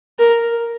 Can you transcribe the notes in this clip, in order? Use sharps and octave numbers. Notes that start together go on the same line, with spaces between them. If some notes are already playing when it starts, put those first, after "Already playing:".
A#4